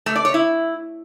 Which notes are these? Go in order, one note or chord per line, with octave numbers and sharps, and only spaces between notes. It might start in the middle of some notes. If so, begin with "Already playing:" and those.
A3
D5
C#5
E4